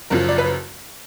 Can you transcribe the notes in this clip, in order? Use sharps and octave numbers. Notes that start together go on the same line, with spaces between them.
F#1 F#2 F3 A#4
D5
B4